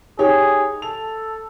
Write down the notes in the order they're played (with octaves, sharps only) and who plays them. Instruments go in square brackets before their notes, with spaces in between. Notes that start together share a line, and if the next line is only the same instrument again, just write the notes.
[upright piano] D#4 G4 C#5 [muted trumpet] G#4
[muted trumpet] A4 [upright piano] F7